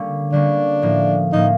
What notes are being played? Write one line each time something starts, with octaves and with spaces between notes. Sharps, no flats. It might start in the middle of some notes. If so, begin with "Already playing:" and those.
Already playing: D3 G3 A#3 C#4
D3 G3 A#3 C#4 D4
A2 F3 A#3
A2 F3 A#3 D#4